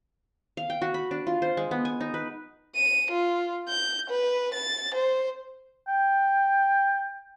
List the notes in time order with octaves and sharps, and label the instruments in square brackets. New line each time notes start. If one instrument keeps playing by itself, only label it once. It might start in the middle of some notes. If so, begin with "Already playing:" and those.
[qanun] F5
G5
F#4
B5
D4
F4
C5
G#3
B3
G#5
D#4
B4
[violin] D#7
F4
G6
B4
A6
C5
[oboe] G5